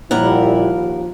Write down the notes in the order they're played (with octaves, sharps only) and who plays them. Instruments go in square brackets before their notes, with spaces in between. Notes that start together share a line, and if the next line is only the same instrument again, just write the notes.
[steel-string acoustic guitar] D#2 A#4 F#5 [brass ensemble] A#2 G3 E4 [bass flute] F3